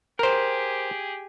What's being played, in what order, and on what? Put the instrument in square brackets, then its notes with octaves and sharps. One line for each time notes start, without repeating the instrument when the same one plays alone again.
[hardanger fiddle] G4 G#4 [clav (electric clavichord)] A#4 C5